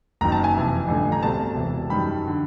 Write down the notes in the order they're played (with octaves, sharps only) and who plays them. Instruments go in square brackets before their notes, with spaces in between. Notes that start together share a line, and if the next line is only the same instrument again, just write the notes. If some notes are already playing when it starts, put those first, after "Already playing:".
[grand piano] F#1 F#2 D#3 A#5
A5
G#5
F2 C3 E3
A1 G2 D3 F3 A3
A#5
C2 B2 F#3 A3 C4 A5
E1 E2 C3 E3
F#2 D#3 G3 B5
D3